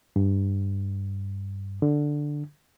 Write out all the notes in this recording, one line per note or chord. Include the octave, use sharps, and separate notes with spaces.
G2
D3